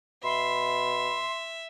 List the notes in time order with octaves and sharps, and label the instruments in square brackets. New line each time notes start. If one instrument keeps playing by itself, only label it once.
[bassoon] B2 [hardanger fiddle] E5 [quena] B5 [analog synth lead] C6